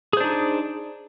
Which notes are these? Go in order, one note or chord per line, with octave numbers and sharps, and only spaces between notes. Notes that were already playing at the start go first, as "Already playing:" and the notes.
D4 D#4 G#4 C5